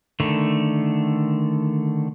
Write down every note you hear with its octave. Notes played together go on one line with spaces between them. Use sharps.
D3 D#3 A3